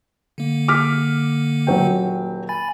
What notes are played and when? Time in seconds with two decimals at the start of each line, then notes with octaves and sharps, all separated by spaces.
0.38 D3 A#3
0.68 D6 F6 B6
1.67 D#1 F#3 G5
2.49 G#5 B5 A6